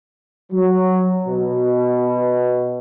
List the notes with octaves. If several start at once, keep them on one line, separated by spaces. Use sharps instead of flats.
F#3
B2